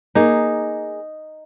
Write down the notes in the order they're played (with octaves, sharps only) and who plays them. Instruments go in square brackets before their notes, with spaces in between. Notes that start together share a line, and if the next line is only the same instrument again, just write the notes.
[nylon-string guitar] A#3 G#4 [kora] D#4